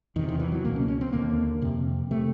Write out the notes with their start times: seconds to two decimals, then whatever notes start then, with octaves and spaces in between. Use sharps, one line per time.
0.16 E2 C3 D#3
0.29 D#3
0.39 E3
0.52 F#3
0.65 C#2 B2 A#3
0.76 C#4
0.88 C#4
1.01 C4
1.13 D#2 D3 A#3
1.62 F2 C3
2.11 C3 A3